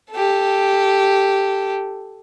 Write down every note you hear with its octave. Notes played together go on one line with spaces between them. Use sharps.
G4 A4